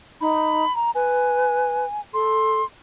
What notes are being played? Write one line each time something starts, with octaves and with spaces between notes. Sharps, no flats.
D#4 B5
A#5
B4 G#5
A4 C6